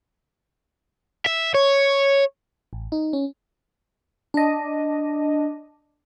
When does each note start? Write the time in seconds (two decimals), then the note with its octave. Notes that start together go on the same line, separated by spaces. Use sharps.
1.26 E5
1.54 C#5
2.73 A1
2.92 D#4
3.13 C#4
4.34 D4 D#5